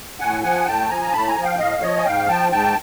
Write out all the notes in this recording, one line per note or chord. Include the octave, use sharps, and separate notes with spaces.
A2 F#5 G#5
F3 F#5 G#5
A2 G5 A5
F3 G#5 A#5
A#5
A2 A5 B5
G#5 A#5
F3
F5 G5
A2 D#5 F5
F3 C#5 D#5
G#5
G#2 F5 G5
F3 G5 A5
G#2 G5 A5